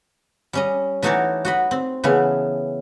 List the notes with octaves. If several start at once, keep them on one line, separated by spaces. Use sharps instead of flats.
G3 C#4 D#5
E3 A3 D#4 F#4 C#5 D5
F#4 D#5 B5
C4
C#3 E3 A3 B3